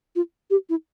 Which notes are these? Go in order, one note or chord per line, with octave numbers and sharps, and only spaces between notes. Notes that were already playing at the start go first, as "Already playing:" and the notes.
F4
G4
E4